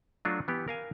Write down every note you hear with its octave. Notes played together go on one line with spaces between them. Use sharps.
F#3 A3 D4 F4 F#4
E3 B3 G4
A#4 F5 G#5